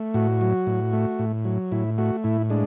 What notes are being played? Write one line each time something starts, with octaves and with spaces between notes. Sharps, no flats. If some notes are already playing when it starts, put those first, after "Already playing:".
Already playing: A3
A2 F#4
F#3
A2
A3
A2
F#3
A2 E4
A3 F#4
A2 E4
G#3 D4